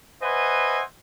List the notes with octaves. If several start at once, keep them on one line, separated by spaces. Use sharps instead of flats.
B4 C5 D#5 E5 F#5 G#5